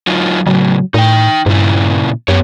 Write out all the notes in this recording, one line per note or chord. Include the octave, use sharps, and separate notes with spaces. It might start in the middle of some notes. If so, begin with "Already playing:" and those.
F#3 D#4 F4
A2 C#3 F#3
A2 D#4 G5
G2 A#2 C#3 E4
F#2 B3 G4 C#5